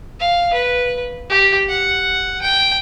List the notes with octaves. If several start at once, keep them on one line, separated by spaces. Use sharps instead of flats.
F5
B4
G4
F#5
G5